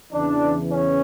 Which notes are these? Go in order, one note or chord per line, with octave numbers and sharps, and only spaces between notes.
E2 C#3 E3 D4
C#4